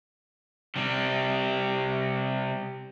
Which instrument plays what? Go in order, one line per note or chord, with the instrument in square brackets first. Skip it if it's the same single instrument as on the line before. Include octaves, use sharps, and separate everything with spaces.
[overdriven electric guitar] C3 G3